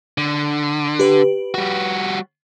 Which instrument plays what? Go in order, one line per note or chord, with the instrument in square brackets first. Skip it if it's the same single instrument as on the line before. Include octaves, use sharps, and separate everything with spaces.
[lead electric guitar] D3
[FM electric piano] G4 B4
[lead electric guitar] G3 F#4